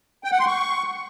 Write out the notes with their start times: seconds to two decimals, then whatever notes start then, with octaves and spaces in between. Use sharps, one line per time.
0.24 G5
0.32 F#5
0.39 C6
0.47 C#6